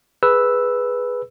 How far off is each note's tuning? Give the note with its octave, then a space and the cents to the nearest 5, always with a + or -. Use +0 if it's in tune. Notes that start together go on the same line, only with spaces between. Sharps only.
G#4 +0 B4 +0 E6 -5